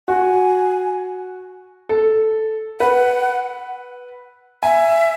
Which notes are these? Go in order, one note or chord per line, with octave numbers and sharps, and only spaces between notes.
F#4 G#5
A4
B4 F#5
E5 G#5